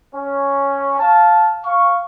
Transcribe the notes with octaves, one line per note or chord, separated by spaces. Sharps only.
C#4
F5 A5
F5 C#6